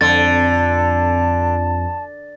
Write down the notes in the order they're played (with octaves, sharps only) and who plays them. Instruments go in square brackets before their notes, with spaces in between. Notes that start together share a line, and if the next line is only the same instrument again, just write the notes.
[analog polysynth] F2 [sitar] D3 [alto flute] A5 [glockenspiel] A6